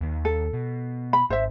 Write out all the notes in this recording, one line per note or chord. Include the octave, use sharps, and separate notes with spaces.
D#2 D#3
A4
B2
B5
G#1 C5 E5